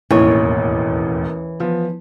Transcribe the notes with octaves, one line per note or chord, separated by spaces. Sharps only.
E1 A1 D#2 E3 C#5
F3 B3